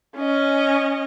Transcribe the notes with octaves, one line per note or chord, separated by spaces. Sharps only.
C#4 D#5